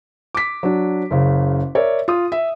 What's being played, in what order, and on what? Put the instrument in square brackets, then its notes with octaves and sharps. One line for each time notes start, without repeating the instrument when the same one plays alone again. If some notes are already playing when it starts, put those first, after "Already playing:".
[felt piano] D6 B6
F#3 D4
F#1 C#3
A#4 C#5 D5 E5
F4 D#6
E5